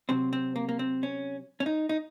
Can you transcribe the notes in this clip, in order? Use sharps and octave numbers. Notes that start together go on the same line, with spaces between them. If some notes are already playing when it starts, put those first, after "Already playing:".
C3 F#3 C4
C4
A#3
A#3
C4
C#4
C#4
D#4
D#4